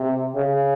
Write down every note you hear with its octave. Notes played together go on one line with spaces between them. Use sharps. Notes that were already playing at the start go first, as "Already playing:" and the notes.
Already playing: C3
C#3